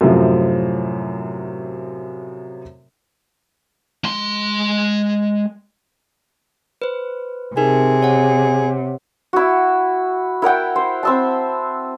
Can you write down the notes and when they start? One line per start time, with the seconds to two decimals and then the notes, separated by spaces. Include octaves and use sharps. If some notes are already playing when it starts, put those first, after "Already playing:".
0.01 F#2 A2 C3 F3
4.04 G#3 C6
6.82 B4 C5
7.57 C3 D#4 G#4 A#4
8.03 C#5 F#5
9.33 E4 F#4
10.42 E4 A#4 F#5 G5
10.76 C5
11.03 C4 E5 A5